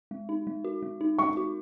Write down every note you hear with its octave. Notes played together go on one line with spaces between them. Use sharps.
G#3
D#4
G#3
F#4
G#3
D#4
G#3 C#6
F#4